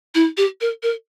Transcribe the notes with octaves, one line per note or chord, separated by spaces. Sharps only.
E4
G4
A#4
A#4